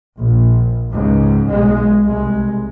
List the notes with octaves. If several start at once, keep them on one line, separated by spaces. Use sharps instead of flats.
A#1
C#2 G#2
B1 G#3
C2 G#3